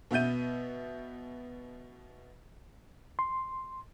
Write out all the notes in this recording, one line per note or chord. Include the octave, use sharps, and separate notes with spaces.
B2 B3 E5 G6 D#7
C6